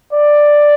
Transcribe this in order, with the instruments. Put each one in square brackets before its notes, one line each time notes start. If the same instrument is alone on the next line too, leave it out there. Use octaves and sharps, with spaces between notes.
[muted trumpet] D5